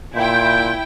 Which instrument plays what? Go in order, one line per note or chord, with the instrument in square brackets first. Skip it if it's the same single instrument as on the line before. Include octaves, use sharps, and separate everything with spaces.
[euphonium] A#2 [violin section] E4 G5 [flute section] C6 G6